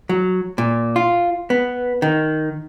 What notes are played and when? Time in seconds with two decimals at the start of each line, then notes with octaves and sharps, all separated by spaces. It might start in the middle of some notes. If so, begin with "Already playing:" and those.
0.09 F#3
0.58 A#2
0.96 F4
1.50 B3
2.02 D#3